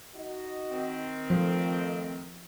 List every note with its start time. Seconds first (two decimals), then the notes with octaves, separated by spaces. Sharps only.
0.14 D#4 F#4 D#5
0.71 D#3 C4
1.30 F2 F3 A3